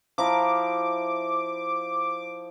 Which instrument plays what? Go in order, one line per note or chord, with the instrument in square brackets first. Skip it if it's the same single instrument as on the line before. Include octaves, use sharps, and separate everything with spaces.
[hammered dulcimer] F3 E4 A#5 [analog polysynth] D6